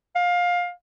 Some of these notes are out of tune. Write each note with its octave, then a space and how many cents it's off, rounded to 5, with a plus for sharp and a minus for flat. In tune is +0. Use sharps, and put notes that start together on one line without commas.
F5 +20